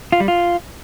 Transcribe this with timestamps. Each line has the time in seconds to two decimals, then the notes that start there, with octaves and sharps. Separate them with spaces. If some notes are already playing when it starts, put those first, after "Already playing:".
0.12 F4
0.20 G3
0.28 F4